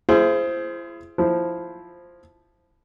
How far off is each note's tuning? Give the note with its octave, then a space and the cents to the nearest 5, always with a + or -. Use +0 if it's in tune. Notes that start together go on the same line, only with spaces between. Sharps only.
E4 +40 G#4 +15 C5 +0
F3 +0 E4 +0 C5 +0